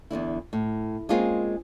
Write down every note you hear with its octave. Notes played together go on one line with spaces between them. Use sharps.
E2 G#2 D3 E4
A2
G#3 A#3 C4 C#4 F4 G#4